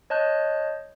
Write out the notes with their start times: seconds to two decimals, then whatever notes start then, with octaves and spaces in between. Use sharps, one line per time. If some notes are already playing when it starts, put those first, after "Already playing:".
0.10 C#5 D#5 A5 F#6 G6